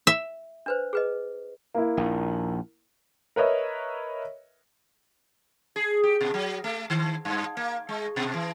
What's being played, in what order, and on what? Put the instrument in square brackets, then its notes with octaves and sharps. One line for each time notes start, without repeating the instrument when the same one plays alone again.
[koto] E5
[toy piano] D4 B4 C5
G#4 B4 D#5
[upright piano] A#3 E4
[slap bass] A#1 D#2
[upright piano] A#4 B4 C#5 D#5 E5
[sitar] G#4
G4
B2
F#3
A3
D#3
G2
A#3
G#3
B2
E3